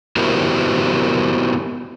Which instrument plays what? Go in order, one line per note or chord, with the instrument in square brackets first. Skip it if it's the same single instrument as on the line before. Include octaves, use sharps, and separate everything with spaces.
[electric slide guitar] B3 E4 F#4 G4 A#4 C5